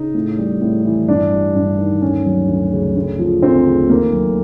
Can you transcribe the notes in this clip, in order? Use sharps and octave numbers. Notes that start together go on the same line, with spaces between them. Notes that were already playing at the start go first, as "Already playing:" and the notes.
Already playing: C#3 D#4
A2
G3
A2
E3
G2 D4
G3
G2
D#3
D2 C#4
F#3
D2
C#3
D2
F3
D2 C4
C#3
D#2 A#3
F#3